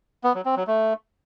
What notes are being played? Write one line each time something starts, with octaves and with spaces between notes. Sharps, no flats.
B3
F#3
C4
F#3
A3